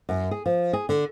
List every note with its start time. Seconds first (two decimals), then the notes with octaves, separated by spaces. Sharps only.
0.09 F#2
0.31 G#4
0.46 F3
0.73 G#4
0.89 D3